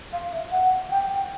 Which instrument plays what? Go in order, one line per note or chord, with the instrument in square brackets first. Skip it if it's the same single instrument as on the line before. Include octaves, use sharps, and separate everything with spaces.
[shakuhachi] F5
E5
F#5
G5